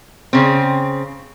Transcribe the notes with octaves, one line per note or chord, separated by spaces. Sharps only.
C#3 C4